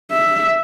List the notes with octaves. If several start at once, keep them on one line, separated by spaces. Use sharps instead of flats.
E5